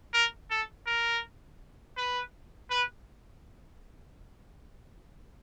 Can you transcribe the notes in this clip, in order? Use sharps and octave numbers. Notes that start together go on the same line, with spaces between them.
A#4
A4
A#4
B4
B4